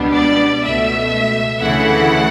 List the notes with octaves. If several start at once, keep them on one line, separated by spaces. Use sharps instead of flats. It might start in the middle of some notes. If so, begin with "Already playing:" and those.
Already playing: C#2 B2 G3 B3 D4
D5
C#2 B2 A3 E5
D2 C#3 E3 A3 E4 F#5